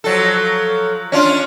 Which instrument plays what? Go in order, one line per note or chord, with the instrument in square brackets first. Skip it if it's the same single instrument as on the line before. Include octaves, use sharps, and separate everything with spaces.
[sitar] F3 F#3 A4
C#4 D4 F4